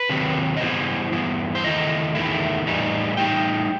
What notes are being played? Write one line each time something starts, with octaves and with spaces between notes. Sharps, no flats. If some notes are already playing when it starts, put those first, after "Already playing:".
Already playing: B4
C3 D#3 F#3 C4
D#5
G2 E3 B3 E4 C5
G2 E3 B3 E4
C5
E2 D#3 A3 E4 D#5
E2 D#3 A3 E4
A2 E3 G3 D#4
A2 E3 G3 D#4 G5